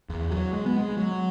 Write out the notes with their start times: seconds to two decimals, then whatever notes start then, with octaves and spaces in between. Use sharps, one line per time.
0.09 E2
0.31 F#3
0.53 G#3
0.66 B3
0.78 G#3
0.97 F#3